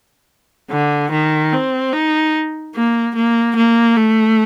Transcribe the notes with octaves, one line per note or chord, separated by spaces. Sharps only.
D3
D#3
C4
D#4
A#3
A#3
A#3
A3